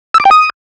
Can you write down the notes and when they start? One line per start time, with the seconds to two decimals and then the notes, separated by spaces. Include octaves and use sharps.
0.14 E6
0.20 D6
0.25 G5
0.31 D#6